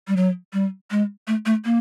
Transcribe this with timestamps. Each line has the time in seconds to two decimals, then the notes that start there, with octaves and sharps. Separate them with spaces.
0.08 G3
0.16 F#3
0.53 G3
0.91 G#3
1.27 A3
1.46 A3
1.65 A#3